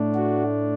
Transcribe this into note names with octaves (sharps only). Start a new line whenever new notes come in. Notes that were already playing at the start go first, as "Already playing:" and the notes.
Already playing: A2 A3 D4
F#4